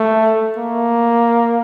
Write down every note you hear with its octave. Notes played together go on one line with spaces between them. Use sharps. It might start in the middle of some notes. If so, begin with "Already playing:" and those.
Already playing: A3
A#3